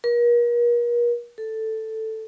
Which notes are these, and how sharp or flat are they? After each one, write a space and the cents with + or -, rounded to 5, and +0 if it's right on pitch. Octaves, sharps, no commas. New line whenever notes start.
A#4 +40
A4 +5